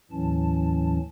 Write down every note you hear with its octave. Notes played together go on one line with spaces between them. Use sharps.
D#2 A2 E3 F#3 C#4 A5